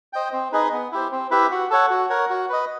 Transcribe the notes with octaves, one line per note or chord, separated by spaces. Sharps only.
C5 D#5 G5
C4
D#4 G#4 B4 D#5
B3
E4 G4 C5
C4
E4 G4 B4 E5
F#4
A4 C#5 F#5
F#4
A#4 C#5 F#5
F#4
B4 D#5